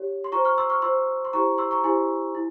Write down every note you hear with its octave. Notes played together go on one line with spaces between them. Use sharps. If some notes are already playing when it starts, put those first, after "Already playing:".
Already playing: G4 C#5
C6
F4 C5 A#5 C#6
C#6 F6
C6 E6
C#6 F6
F4 C5 C6 E6
C6
E4 G4 C5 A#5 C#6
C6 E6
A#5 C#6
E4 G4 C5 G#5 C6
E4